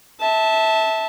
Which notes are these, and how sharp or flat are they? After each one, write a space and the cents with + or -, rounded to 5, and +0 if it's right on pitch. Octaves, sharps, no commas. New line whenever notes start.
E5 -20 A5 +0